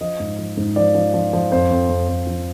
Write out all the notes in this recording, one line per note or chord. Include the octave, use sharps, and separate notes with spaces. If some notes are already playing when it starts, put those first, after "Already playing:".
F3 D#5
G#2
F3
G#2
F3 D5
F3
F3
F3
F2 C5
F2
F2
F2
F3